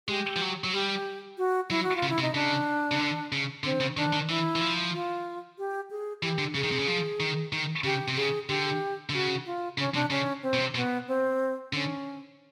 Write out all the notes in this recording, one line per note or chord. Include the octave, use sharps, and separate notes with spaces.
G#3 G4
F3
F#3
F#3
G3 G4
F#4
F#3 E4
F#4
F4
C#3
E4
C3
D#4
C#3 D4
C#3
D3
C#3
D3 C4
C#3
D#3 D4
D#3
E3 E4
E3
F3
F4
G4
G#4
E3 G4
D3
C#3 G#4
D#3
C3
C#3
F3
D#3
D#3
C#3 G4
C3
C#3 G#4
D3 G4
D3
C#3 F#4
F4
C#3 C#4
C3 D4
C#3 C#4
C4
B2
C3
B2 B3
C4
D3 C#4